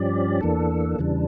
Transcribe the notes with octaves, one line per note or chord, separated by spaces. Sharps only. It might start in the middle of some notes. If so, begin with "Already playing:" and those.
Already playing: G2 F3 C#4 G4 D5
E2 E3 A#3 D4 A4
E2 C#3 E3 G3 D4